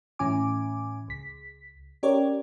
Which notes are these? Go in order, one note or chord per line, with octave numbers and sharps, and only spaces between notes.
A2 E3 C#4 G#5 D6
C#2 B6
C#4 G4 A#4 C#5 D5